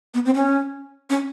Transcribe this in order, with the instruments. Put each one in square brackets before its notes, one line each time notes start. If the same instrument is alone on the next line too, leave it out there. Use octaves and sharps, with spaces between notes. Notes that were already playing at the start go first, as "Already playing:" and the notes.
[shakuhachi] B3
C4
C#4
C#4